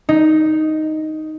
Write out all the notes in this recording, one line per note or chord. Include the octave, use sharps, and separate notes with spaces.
D#4